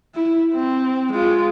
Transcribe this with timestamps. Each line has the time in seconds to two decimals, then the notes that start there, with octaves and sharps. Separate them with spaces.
0.15 E4
0.54 C4
1.12 G#3 F4